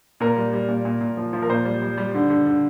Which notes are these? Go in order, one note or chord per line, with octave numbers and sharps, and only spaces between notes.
A#2 A#4
G3
G3
A#2
A#2
A#2
F3
F3
A#4
A#2 C5
G3
G3
G3
D3
D3
D3